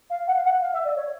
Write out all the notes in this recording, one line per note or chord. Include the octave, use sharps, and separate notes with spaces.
F5
F#5
F5
F#5
F5
E5
D5
C#5